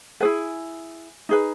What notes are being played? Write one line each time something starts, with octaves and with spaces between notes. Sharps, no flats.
E4 G#4 B4 G#5
D#4 G#4 B4